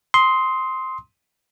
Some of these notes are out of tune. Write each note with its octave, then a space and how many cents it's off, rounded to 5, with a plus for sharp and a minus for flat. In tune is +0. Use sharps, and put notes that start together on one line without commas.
C6 +0 D#6 +30